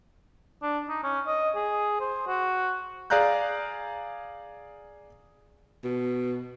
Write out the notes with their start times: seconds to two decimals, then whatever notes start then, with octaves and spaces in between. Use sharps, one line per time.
0.63 D4
0.89 D#4
1.04 C#4
1.27 D#5
1.56 G#4
2.00 C5
2.27 F#4
3.10 G#4 D5 F5 A#5 F#6 G6
5.84 B2